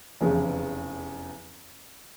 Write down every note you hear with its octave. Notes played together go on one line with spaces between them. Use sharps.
F1 E2 C#3 E3